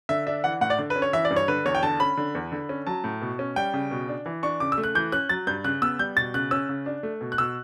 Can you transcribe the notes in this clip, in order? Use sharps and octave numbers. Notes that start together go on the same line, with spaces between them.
D3 E5
D4 E5
E3 F#5
A2 F#5
D5
D3
B4
C#4
C#5
E3 E5
D5
G2
C#5
D3 B4
E2 C#5
G5
D3 A5
C#4 B5
D3
E2
D3
C#4
F#3 A5
A2
B2
C#4
G3 G5
C#3
B2
D4
E3
D4 C#6
C#3 D6
E6
A3
F#6
E3 G6
C#4 F#6
F#3 A6
G2 G6
C#3 F#6
B3 E6
G3 G6
B2 A6
C#3 F#6
C#4 E6
C#3
D4
A3
B2
F#6
B2 E6